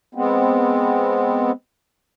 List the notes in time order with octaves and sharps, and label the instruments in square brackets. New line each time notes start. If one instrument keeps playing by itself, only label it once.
[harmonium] G#3 B3 C4